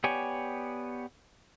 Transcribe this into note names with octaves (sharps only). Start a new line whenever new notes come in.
B3 G4 C#5 D5 G#5